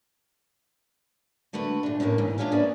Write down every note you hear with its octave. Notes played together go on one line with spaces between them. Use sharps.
D3 A3 F#4 B4
A#2 D4
A2 C#3 G3 A3 A#3
G#2 E3
A#3 D4 F4 C#5 E5 F5
A#3 C#4 G#4 B4 D5 E5